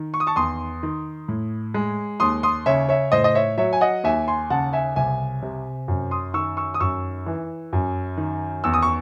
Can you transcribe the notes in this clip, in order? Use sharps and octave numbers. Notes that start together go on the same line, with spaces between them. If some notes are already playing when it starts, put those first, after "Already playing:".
Already playing: D#3
C#6
D#6
A5 C#6
E2 C6 D#6
D#3
A2
G#3
D#2 C6 D#6
C6 D#6
C#3 C#5 E5
C#5 E5
A2 C5 D#5
D#5
C#5 E5
F#3 C#5 E5
G#5
D#5 F#5
D#2 E5 G#5
G#5 C6
C#3 F#5 A5
E5 G#5
C2 E5 G#5
C3
F#2
C6 D#6
D#3 C#6 E6
C#6 E6
D#6
F#2 C#6 E6
E3
F#2
D#3
E2 E6
D#6
C#6